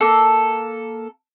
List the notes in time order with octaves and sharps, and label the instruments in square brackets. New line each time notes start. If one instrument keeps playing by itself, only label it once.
[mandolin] A#3 A4